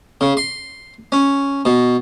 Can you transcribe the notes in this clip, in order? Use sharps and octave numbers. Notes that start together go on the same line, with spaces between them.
C#3
C6
C#4
B2